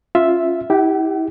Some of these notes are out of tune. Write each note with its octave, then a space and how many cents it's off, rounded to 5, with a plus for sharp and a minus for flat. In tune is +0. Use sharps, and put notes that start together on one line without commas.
C#4 +0 F4 +0 E5 +0
E4 -35 G4 +0 F#5 +45